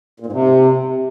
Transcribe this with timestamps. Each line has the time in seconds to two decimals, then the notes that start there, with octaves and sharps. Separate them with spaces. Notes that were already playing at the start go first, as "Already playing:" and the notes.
0.20 A#2
0.26 G#2
0.32 C3